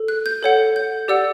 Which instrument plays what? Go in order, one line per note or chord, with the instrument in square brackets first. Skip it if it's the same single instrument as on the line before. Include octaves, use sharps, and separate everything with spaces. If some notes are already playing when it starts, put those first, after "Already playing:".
Already playing: [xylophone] A4
F#6
G6
A4 C#5 F#5
G6
G4 D5 F#5 E6